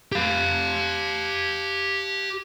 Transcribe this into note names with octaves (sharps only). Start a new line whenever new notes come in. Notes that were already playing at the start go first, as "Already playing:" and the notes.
G4 F5